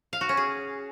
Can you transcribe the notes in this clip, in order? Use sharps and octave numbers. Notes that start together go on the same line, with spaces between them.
F5
F#4
C#4
G#4